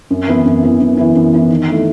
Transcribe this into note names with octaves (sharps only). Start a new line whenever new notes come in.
F#2
E3 B3 E4
F#2
E3 B3 E4
F#2
E3 B3 E4
F#2
E3 B3 E4
D#3
A3 E4